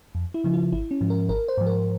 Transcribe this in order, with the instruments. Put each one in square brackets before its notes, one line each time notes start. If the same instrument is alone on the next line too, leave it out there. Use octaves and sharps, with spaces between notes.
[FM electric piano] F2
E4
C#3 F3
F4
G#1 E4
C#4
G#2 F3
A#4
G#1 A#4
C5
G#2 F3
A#4